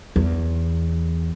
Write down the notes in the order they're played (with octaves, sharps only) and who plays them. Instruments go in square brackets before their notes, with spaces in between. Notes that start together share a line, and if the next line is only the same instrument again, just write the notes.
[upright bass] E2